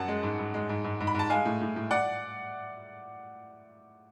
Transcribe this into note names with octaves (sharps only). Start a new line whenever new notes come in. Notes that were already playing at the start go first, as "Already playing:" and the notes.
Already playing: F#2 F#5 A5
G#3
G#2
G#2
G#3
G#2
G#2
G#2
B5
G#2 A5
G#3 F5 G#5
A2
A2
A2
D5 F#5